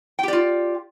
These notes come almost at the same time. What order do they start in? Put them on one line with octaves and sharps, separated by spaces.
G5 G4 D5 F4